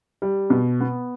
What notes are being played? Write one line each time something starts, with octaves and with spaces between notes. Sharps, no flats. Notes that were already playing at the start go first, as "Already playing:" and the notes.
G3
B2
B3